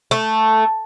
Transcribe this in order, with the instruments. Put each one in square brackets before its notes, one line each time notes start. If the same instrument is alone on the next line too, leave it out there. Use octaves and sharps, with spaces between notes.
[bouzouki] A3